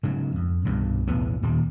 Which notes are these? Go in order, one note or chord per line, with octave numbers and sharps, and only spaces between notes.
G#2 C#3 F#3
F2
C2 G2 B2
B1 E2 A2 B3
D#1 D#2 A#2 G3